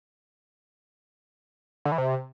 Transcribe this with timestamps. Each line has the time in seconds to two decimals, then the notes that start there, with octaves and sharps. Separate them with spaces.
1.85 D3
1.92 E3
1.98 C3